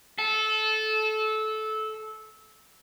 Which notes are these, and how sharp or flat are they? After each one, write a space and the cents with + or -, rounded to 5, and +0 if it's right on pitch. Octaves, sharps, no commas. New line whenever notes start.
A4 -20